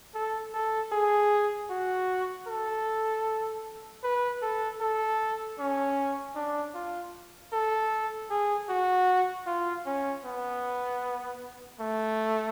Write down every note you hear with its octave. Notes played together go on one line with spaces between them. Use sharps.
A4
A4
G#4
F#4
A4
B4
A4
A4
C#4
D4
F4
A4
G#4
F#4
F4
C#4
B3
A3